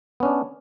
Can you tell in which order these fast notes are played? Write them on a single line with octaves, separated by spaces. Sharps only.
B3 C#4 D4